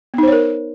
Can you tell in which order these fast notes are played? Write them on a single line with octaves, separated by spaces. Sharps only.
B3 D#4 C5 C#5 A#4